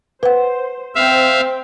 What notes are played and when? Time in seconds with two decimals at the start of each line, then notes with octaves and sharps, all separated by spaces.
0.23 B4 C5 F#5
0.95 C4 C5 E5 F5 G5